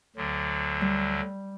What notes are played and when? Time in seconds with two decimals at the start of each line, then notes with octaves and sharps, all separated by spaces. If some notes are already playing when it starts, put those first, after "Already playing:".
0.16 D2 D3 F#3
0.81 G3